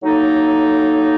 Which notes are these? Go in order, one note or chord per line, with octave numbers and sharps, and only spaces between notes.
A2 F#3 A#3 D#4 A4